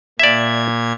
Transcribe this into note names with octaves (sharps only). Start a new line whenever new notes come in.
A#2 D5 E5 G#6